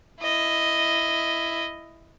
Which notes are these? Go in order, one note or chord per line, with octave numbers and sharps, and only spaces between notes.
E4 D#5